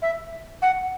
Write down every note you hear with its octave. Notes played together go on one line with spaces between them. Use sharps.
E5
F#5